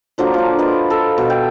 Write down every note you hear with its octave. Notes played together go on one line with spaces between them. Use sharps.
D3 F3 F#3 A#3
D4 F4
A#4 B4 D#5
A4
B2
G5